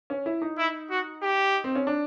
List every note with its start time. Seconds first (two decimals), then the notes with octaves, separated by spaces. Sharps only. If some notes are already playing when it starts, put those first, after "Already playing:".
0.10 C#4
0.26 E4
0.42 D#4
0.58 E4
0.90 F#4
1.23 G4
1.64 C4
1.75 C#4
1.87 D4